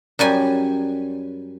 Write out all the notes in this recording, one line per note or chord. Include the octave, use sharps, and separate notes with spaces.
F#2 G3 G#5